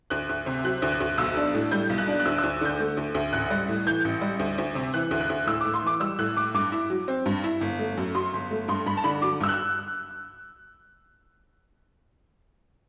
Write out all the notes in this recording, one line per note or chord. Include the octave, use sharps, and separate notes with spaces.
D2 F#6
D2
C3
F#3 F#6
D2
F#6
D2
B1 E6
D4
A2
G3 G6
B1
F#6
D4
F#6
D2 E6
E6
D2
D3 G6
A3
D2
D2
A1 F#6
G3
A2
E3 G6
A1
G3
D2
D2
C3
E3 F#6
D2
F#6
D2
A2 E6
D6
A2
C6
E3 D6
G3 E6
A2 F#6
A2 D6
G2 D6
E4
F#3
C4
G2
E4
G1
A3
F#2
F#3 C6
G1
A3
G2 C6
G2 B5
A5
D3 B5
F#3 D6
G2 E6
F#6